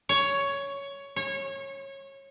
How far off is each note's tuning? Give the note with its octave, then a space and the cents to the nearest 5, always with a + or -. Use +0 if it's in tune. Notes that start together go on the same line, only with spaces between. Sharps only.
C#5 +10
C#5 -20